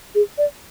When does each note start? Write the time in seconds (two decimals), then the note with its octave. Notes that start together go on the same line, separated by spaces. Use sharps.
0.15 G#4
0.38 D5